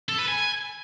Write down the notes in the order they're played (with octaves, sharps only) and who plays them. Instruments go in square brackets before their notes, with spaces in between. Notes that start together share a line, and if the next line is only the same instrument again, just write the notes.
[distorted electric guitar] A4
B4
G#5